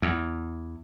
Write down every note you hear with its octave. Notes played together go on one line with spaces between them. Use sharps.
E2